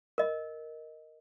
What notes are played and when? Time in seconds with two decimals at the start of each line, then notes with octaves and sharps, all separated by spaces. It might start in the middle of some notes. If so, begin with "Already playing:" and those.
0.18 A#4 D#5